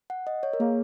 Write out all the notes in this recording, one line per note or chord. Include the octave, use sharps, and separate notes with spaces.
F#5
D#5
C#5
A#4
A#3 G#4